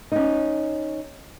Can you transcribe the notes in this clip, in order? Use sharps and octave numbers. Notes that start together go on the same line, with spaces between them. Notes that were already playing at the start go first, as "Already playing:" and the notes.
C#4 D#4